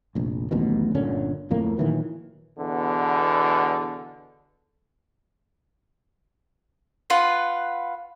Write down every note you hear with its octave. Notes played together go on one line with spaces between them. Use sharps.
F1 A#1
D1 A1 D#2 B2
G1 A#2 D3 C#4
D1 F2 A2 A#3
A#2 D#3 E3 F#3
E2 B2 D3
F4 B4 F#5